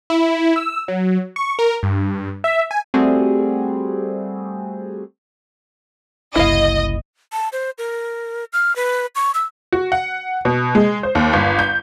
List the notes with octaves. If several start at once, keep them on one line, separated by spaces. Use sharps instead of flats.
E4
E6
F#3
C#6
A#4
G2
E5
G#5
G3 A3 C4 F#4 G#4
F#1 C2 E4 D#5 F5
A5
C5
A#4
F6
B4
C#6
E6
F#4
F#5
B2
G#3
C5
D#2
G1
G6